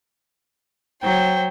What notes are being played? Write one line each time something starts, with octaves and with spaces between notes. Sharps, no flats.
F#3 C5 G5